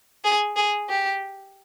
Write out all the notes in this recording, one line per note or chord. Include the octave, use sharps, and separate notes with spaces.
G#4
G#4
G4